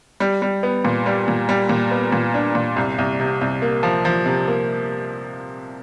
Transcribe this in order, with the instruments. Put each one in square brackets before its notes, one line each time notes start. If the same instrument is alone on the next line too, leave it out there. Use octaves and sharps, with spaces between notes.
[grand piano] G3
G3
B3
A#2
G3
A#2
G3
A#2
B3
A#2
D4
A#2
C2
C2
C3
C2
A#3
F3
F3
C3
A#3